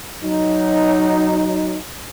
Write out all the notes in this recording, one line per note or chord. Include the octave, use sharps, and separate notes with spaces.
F#3 D#4